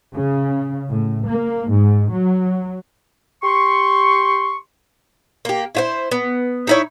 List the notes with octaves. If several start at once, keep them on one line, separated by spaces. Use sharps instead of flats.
C#3
A2
A#3
G#2
F#3
G4 C6 C#6
A#3 G4
E4 F4 C5
B3
D#4 E4 C#5